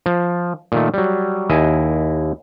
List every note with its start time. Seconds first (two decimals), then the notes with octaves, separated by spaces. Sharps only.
0.06 F3
0.72 A#2 D#3 A3
0.94 F#3 G3
1.49 D#2 E4 D#5 G#5